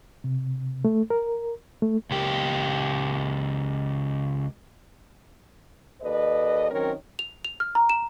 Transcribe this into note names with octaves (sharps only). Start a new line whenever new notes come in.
C3
A3
A#4
A3
C#2 G4
D#2 A4 B4 D5 D#5
D#3 F#3 C4 C#4 A#4 C#5
F7
F7
F6
A#5
E7